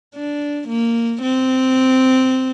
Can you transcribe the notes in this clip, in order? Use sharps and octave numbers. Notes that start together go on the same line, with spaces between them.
D4
A#3
C4